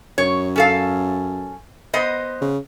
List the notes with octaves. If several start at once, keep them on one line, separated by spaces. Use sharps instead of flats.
F#2 C#5
C#4 A4 F5
B3 C5 D#5
C#3